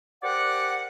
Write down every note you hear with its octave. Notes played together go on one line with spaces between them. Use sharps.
G4 A#4 C5 D5 F#5